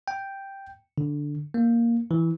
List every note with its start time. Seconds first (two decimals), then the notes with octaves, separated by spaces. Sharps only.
0.08 G5
0.98 D3
1.54 A#3
2.11 E3